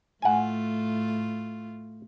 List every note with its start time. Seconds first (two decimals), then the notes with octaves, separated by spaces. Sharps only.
0.22 A2 A3 F4 F#5 G#5